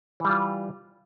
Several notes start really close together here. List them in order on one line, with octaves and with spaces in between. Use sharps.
E3 G3 F4